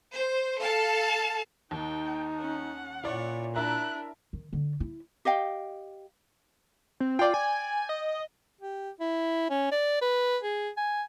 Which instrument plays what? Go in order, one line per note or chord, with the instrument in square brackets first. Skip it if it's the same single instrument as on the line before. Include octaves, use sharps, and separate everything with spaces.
[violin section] C5
A4 F5 A5
[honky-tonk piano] D#2 [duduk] D#4 [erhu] G5
[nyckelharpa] C#4 [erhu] F#5
[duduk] A#2 [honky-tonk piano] E4 D5 [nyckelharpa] C#5
[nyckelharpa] D4 E4 [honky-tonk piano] A#4 E5 A#5 [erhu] F#6
[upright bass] D#3
D3
E4
[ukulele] G4 D#5 F5 G5
[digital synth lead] C4
[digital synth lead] F4 [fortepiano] D5 G5
[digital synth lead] G#5
D#5
[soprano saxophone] G4
E4
C#4
D5
B4
G#4
G#5